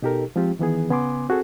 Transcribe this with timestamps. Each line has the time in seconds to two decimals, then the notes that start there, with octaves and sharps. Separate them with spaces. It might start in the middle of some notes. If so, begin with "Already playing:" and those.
0.02 B2 D#4 G4 A4 A#4
0.36 F3 G#3 C4 F4 G4
0.59 D#3 E3 B3 G#4
0.89 C#3 B3 G#5 C6 D6
1.29 C4 F#4 G#4 A4